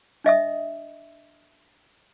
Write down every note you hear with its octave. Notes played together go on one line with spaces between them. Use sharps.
D4 D#5 E5 D#6